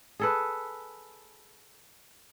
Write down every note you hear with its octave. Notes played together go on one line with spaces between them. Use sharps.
G#4 A4 B4